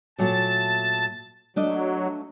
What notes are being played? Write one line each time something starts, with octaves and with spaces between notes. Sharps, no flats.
A#2 F#3 A3 A5
F#3 A3 D4 D#5